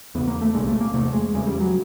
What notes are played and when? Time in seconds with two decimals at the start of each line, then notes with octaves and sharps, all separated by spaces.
0.15 E2 C#3 B3
0.28 A#3
0.41 A3
0.54 C2 A#2 G#3
0.68 A3
0.80 A#3
0.94 E2 C3 A3
1.13 G#3
1.34 E2 C#3 G#3
1.47 G3
1.60 F#3